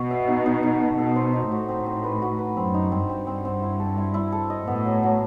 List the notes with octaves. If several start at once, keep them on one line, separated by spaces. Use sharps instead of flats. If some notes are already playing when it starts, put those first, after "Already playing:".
Already playing: B2 F#4
E5
D#4
D#4
D#4
A4
B2 A4
C5
D#4
A2 F#4
C4
C4
B4
F#4
B4
F#2 C4
D#4
C4
G2 C4
C4
C4
E4
A4
E4
E4
A4
D#5
A2 B3
F#3
F#3